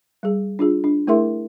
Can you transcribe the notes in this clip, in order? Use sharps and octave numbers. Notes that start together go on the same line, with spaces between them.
G3 G#4
D4 F4 G#4
D4
A3 E4 G#4 A#4 E5 C6